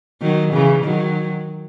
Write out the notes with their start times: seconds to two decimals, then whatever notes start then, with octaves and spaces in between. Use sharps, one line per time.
0.22 D#3 F#3
0.53 C#3 E3
0.84 D#3 F#3